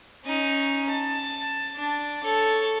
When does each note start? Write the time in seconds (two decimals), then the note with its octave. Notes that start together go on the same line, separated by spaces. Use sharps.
0.25 C#4 D#4
0.90 A5
1.76 D4
2.23 A4 C#5